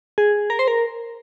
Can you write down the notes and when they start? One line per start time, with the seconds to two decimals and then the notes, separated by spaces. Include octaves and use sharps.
0.18 G#4
0.50 A#4
0.59 C5
0.68 A#4